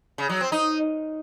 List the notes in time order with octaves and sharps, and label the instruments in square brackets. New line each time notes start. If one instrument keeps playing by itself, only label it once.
[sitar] C#3
F#3
C4
D#4